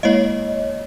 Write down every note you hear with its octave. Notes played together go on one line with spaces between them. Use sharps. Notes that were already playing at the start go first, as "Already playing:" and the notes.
G#3 A#3 E4 C#5 D#5